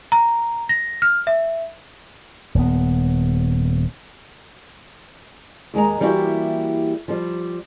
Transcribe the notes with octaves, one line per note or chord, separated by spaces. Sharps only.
A#5
A#6
F6
E5
D#1 B3
D#2 G#3 A#5
E3 G3 A#3 E4 F#4 G4
F3 G3